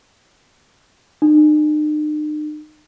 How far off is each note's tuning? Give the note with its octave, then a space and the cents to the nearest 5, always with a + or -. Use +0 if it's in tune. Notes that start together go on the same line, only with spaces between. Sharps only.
D#4 -45